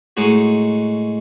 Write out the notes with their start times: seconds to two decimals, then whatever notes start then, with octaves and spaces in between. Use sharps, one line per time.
0.17 A2 G#3 D#4 F#4